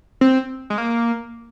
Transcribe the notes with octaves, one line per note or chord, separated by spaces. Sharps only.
C4
G#3
A#3